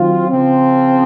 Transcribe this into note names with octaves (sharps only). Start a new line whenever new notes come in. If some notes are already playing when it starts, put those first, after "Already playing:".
Already playing: D#3 F#3 C4 F4
C#3 F3 C4